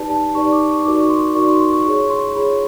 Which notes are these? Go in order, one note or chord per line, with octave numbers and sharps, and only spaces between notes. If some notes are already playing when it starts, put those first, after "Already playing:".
Already playing: D#4 G4 B4 D5 A5
A5
D#4 G4 B4 D5 C#6
D6
C#6
D#4 F#4 A#4 D5 D6
C#6
C6
D#4 F#4 A#4 D5 C#6
C6
C6
C#6
F4 G#4 C#5 C#6
C6
F4 G#4 C#5 B5